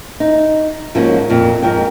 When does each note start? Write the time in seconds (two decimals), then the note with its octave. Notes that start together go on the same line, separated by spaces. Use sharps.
0.20 D#4
0.95 G#2 F3 F#3 A#3 C#4
1.30 F2 A#2
1.62 F2 G#2 A#4 G5